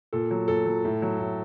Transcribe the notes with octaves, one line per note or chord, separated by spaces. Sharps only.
A#2 A4
F#3
A#2 A4
F#3
A2
F#3
A2